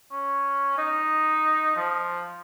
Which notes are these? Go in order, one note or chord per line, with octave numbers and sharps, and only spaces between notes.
C#4
D#4
F3